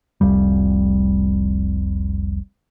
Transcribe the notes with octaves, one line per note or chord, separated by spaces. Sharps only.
F1 C2 F2 G3